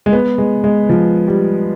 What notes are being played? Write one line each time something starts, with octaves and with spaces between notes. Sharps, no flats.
G#3
B3
G#3
G#3
F3
G3